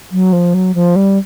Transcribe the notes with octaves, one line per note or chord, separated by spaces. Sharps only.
F#3
F3
F#3
F3
G3